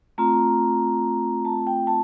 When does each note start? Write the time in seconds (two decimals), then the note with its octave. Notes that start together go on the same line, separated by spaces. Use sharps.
0.18 A3 C4 F4 A#5
1.45 A5
1.67 G5
1.87 A5